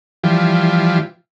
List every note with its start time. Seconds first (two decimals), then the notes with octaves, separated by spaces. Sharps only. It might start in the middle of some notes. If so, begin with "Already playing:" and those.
0.24 E3 F3 G3